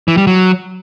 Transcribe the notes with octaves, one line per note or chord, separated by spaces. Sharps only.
E3
G3
F#3